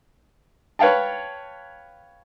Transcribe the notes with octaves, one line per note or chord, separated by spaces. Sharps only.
B4 C#5 F5 G5 A5